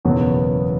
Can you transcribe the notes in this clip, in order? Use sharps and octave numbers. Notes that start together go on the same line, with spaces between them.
F#1 E2 B2 F#3 B3